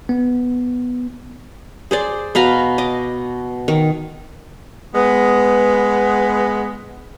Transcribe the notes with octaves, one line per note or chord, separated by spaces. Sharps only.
B3
G#4 C5 D5
B2 B4 F5 A#5
D#5 D6
D#3
G#3 B3